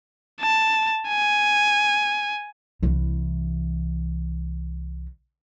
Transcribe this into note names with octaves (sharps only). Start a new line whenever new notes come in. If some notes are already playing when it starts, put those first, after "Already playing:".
A5
G#5
C2 E3